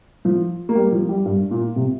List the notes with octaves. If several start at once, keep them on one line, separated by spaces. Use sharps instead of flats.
F3
A#3
G3
F3
G3
G2
A#2
C3